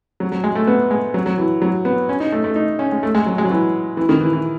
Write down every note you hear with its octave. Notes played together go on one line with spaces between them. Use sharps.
F#3
F#3
G#3
A3
B3
G#3
F#3
F#3
E3
F#3
B3
C#4
D#4
A3
A3
D#4
C#4
G#3
A3
G#3
F#3
G#3
F#3
E3
E3
D#3
E3
E3